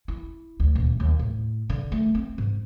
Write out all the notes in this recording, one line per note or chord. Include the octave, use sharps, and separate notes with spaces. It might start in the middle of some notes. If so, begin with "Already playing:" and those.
E4
D2
D#1
D#2
A2
D3
A3
C4
G#2